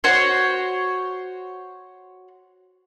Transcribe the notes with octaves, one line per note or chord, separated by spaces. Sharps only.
F#4 C5 C#5 C6